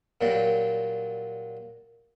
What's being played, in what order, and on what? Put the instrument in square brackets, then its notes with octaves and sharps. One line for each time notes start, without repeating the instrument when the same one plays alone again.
[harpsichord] A#2 F#3 G3 A#3